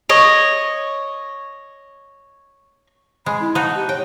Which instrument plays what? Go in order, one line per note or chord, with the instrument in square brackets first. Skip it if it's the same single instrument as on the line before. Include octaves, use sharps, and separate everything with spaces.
[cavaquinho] C#5 D#5
[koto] G#3 [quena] B5
[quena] E4
[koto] D#4 F#4 [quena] A5
[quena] G4
[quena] C#5 [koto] G5